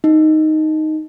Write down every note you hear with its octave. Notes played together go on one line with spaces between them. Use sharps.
D#4